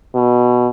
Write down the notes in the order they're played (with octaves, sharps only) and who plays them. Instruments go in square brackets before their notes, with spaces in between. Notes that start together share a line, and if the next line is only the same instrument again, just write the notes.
[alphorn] B2